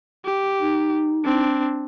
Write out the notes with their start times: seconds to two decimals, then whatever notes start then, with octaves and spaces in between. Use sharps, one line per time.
0.25 G4
0.61 D#4
1.24 C4 D4